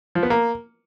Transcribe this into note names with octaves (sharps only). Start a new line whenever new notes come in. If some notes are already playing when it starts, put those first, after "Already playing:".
F3
B3
A#3